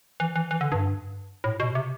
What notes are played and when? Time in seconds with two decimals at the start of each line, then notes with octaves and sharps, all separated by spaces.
0.20 E3
0.36 E3
0.51 E3
0.61 D3
0.72 G2
1.44 A2
1.60 B2
1.75 C3